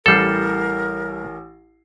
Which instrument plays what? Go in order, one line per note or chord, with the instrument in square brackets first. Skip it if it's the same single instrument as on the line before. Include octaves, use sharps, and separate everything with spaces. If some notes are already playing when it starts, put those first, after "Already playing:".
[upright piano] A1 E3 C7 [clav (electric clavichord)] G3 A4 [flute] A#4